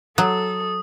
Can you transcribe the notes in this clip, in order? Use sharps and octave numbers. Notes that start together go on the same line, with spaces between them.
F#3 A4 D#6